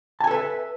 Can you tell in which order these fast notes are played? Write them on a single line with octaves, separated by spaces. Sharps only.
A5 G#5 A4 B4 E5